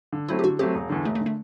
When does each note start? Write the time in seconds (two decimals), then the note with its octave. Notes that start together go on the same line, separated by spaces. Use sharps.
0.12 D3
0.28 F#3 A3 C4 E4
0.39 G4
0.43 D3 F#4
0.59 F#3 A3 C4 G4
0.75 E1
0.90 E2 D3
1.05 E1 A3
1.15 A3
1.21 D3
1.26 A3